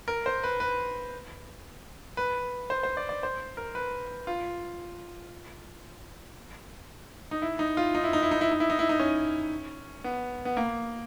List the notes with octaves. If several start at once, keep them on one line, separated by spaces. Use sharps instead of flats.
A#4
C5
B4
B4
B4
C5
C5
D5
D5
C5
A#4
B4
F4
D#4
E4
D#4
F4
D#4
E4
D#4
E4
D#4
E4
D#4
E4
D#4
E4
D#4
C#4
B3
B3
A#3